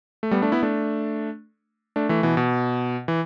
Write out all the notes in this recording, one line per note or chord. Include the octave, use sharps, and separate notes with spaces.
A3
G3 B3
A3 D4
B3 E4
A3 D4
A3 D4
E3 A3
B2 E3
B2
E3